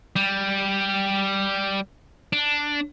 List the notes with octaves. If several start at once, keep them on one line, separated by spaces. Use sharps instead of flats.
G3
D4